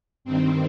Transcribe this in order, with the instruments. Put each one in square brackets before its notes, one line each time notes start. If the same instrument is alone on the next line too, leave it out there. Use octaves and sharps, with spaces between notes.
[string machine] G2 D#3 C4